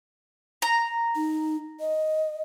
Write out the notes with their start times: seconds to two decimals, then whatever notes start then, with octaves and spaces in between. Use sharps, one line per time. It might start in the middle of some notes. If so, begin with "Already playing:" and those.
0.62 A#5
1.16 D#4
1.80 D#5